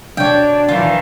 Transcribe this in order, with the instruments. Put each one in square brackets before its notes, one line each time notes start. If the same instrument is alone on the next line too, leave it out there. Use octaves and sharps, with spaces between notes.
[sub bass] B2 [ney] D4 [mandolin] C#5 G5
[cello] D#3 E3 [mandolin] F4